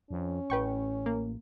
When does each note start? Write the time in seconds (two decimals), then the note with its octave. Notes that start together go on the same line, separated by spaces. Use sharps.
0.11 F2 C#4
0.50 A1 B4 G5 C#6
1.06 A#3